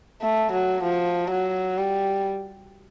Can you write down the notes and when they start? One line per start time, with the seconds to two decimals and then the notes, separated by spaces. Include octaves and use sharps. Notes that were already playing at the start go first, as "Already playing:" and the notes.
0.22 A3
0.52 F#3
0.83 F3
1.31 F#3
1.78 G3